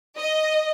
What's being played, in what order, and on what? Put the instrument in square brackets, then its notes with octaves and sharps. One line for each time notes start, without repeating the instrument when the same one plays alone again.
[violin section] D#5